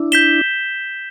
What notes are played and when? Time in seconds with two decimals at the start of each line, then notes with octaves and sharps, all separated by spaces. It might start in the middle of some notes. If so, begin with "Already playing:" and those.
Already playing: D4 E4
0.12 G6 B6 E7 G7